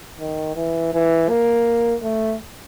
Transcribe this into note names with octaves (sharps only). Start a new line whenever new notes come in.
D#3
E3
E3
A#3
A3